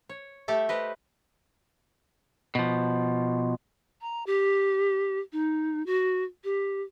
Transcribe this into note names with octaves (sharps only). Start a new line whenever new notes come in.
C#5
A3 G4 A4 E5
G4 B4 C5 D#5
B2 F3
A#5
G4
D#4
F#4
G4